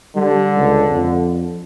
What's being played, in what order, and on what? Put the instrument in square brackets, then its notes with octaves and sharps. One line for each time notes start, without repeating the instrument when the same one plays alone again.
[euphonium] D3 [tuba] G3
[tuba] C#2
F2